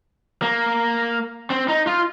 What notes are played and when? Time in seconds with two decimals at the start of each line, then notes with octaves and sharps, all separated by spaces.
0.42 A#3
1.50 C4
1.68 D#4
1.87 F4